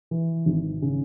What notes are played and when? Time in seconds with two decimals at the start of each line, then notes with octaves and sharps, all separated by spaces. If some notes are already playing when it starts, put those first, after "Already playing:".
0.11 E3
0.46 G#1
0.82 C#3